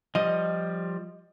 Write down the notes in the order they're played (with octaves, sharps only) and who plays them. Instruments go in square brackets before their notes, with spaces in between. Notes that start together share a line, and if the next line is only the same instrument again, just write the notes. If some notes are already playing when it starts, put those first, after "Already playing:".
[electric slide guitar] F3 G3 [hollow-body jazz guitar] D#5